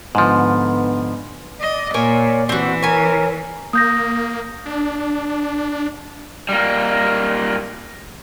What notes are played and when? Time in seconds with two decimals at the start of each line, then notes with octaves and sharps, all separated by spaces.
0.15 G#2 D3 F3 B3
1.61 D5 D#5
1.94 A#2 A#4 C#5 G#5
2.49 E3 C4 F#4
2.83 A#4 C#5 G#5
3.73 A#3 D#6 G6 A#6
4.66 D4
6.49 G3 A#3